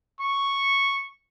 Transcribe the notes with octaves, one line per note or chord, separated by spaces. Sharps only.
C#6